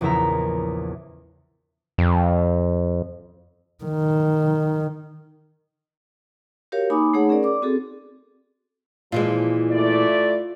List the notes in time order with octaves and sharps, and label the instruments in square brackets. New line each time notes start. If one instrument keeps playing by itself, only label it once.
[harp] A#1 E2 C#3 E4 E5 A#5
[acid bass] F2
[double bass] D#3
[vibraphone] F#4 G4 A#4 C#5 F5
A#3 D#4 G#5 B5 D6 D#6
A3 D#4 G#4 C#5 F#5
C#4 G#4 A#4 D5
D5 D6
C4 F#4 G#4 A4
[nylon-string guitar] A#2 E3 G#3 [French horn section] F3 [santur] F4
[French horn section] A3 E4 D5